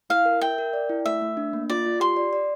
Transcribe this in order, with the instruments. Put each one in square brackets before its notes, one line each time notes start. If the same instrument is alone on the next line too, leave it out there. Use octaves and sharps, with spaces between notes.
[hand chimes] E4 [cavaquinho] F5
[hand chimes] A#4
[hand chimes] E5 [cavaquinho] G5
[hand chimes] A#4
D5
E4
[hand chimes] A3 [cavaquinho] E5
[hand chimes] A3
D4
A#3
[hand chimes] F4 [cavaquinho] D5
[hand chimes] F4
[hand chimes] G4 [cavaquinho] C6
[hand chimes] D5
D5